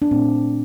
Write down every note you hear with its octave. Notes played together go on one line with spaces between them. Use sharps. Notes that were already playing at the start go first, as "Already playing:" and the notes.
D4
A#2 A3 C4